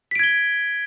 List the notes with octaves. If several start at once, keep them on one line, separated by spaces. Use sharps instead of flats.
G#6 B6 D7 G7